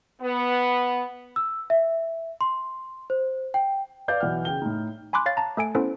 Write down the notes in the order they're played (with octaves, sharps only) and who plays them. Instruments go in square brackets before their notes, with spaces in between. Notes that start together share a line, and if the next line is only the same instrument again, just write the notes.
[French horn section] B3
[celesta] E6
E5
C6
C5
G5
[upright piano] B4 D5 F5 G6
B1 E3 F#5 F6
C#3 G5 G7
A2 D#4
[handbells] G#5 B5 C6 D6 F#6
C#5 F5 A6
A5 A#5
A3 A4 G#5 D7
B3 C#4 E4 A4 C5